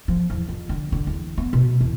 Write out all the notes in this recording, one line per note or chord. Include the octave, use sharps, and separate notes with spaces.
F3
E2
F2
D3
D3
E2
B3
B2
E2